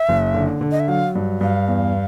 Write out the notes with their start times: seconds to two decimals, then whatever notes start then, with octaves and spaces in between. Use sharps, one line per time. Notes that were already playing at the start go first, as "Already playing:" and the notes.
Already playing: E5
0.09 F#1
0.34 D3
0.61 D3
0.72 D#5
0.80 E5
0.88 F#3 F5
1.15 G2
1.41 G2 F5
1.67 E2